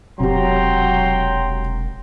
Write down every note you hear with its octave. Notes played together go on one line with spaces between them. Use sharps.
E1 C3 F#3 G4 G5 A#5 C6